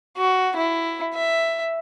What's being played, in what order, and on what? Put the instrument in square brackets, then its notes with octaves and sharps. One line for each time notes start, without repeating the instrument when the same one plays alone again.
[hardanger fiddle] F#4
E4
E5